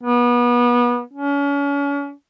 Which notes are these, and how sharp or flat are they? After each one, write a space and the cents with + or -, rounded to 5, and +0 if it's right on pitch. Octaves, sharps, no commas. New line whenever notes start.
B3 -30
C#4 +35